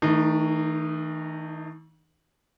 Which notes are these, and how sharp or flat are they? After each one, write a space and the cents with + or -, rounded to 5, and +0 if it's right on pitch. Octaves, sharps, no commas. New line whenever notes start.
D#3 +45 A3 +0 D#4 -25